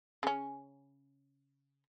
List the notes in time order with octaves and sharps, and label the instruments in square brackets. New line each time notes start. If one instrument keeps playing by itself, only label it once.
[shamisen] C#3 C#4